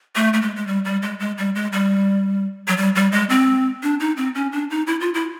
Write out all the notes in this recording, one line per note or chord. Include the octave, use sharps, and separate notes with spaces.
A3
A3
G#3
G#3
G3
G3
G#3
G#3
G3
G#3
G3
F#3
G3
G3
G#3
C4
D4
D#4
C4
C#4
D4
D#4
E4
F4
E4